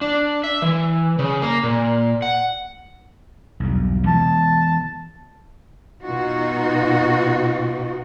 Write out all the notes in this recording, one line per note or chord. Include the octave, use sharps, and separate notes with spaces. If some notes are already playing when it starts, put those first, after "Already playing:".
D4
E5
E3
C#3
A#3
A#2
F#5
B1 E2 G2
E3 G#3 B3 A5
B2 D#4 F4 F#4